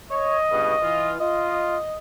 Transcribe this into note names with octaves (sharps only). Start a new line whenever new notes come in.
C#5 D#5
C#2 G2 B2
E3 F4
F4 D#5